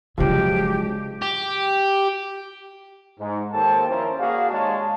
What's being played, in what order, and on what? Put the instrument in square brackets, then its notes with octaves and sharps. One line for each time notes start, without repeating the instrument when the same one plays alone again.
[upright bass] C#3 C4 [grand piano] F3 [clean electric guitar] F#3 G#3 D4 [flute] G4
[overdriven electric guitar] G4
[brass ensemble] G#2
D#2 A#3 A4 C5 G5 A5
D#3 F3 C#4 E4 A#4 C5
A#3 F#4 G#4 D5 F5
D#2 G#3 C#5 A5